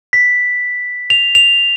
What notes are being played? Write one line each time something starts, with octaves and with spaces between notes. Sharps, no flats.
B6
F7
F7